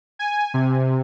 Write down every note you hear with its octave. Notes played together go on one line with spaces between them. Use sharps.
G#5
C3